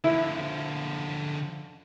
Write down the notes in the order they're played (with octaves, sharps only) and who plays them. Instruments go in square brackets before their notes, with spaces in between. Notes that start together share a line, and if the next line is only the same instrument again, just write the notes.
[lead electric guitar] D3 F3 [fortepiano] E4